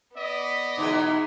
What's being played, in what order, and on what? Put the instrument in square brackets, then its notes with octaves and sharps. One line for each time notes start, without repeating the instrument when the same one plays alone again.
[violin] B3 B6 [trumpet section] D5 D#5
[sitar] B2 E3 G#3 [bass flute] D#4